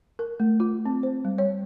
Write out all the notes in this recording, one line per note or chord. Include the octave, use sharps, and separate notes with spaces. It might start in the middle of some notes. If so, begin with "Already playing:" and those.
A#4
A3
F4
C4
C5
G3
C#5